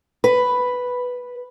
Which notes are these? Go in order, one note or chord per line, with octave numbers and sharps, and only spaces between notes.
B4